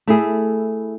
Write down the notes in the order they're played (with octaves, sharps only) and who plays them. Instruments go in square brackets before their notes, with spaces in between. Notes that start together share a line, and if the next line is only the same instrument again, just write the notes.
[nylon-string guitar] A3 E4 G#4